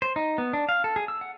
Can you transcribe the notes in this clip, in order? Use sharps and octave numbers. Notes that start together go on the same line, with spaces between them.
C5
D#4
B3
D4
F5
A4
G#4
E6
F#5